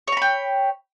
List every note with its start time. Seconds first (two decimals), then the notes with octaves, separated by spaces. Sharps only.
0.08 C#5
0.12 A#5
0.17 B5
0.22 G5